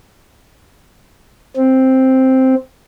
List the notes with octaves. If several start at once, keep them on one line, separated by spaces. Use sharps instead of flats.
C4